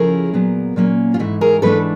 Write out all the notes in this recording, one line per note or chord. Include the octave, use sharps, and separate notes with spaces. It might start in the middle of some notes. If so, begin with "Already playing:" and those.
Already playing: C#3 F3 A3 C#4 E4 G#4 A#4
A#2 F#3 B3
A#2 F#3 A#3 C#4
F4
G#2 E3 A3 E4
G#4 A#4
G#2 E3 A3 D4 A4 B4